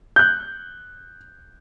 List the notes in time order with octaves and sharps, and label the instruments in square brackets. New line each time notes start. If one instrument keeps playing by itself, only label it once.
[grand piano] F#6 G6